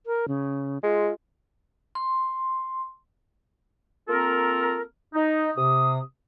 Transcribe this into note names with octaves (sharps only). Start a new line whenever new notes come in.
A#4
C#3
G#3 F4
C6
A#3 C4 F4 A4 A#4
D#4
C3 D#6